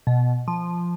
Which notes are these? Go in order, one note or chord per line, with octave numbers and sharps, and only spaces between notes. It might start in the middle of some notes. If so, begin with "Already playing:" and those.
B2
F3